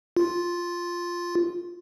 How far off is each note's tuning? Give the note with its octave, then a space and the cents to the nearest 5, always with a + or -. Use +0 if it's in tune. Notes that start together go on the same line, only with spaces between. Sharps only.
F4 +0